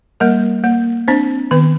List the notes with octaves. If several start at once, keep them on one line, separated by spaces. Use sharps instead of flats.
G3 A#3 A#4
A#3
C4 D4 C5
D#3 B3 B4